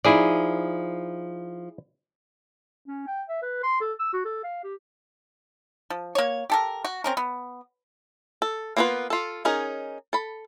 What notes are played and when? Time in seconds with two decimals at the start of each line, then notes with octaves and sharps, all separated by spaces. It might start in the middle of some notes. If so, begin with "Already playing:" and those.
0.05 F3 D#4 E4 G#4 D5
2.87 C#4
3.07 G5
3.29 E5
3.42 B4
3.63 C6
3.81 A4
3.99 E6
4.13 F#4
4.25 A4
4.44 F5
4.64 G4
5.90 F3
6.15 A#3 C#5
6.50 G4 A4 A#4
6.85 F#4
7.04 C4 C#4 A#4
7.17 B3
8.42 A4
8.77 A#3 B3 D4 F4 B4
9.10 F4 A4
9.45 C#4 D#4 G#4 A#4
10.13 A4 B5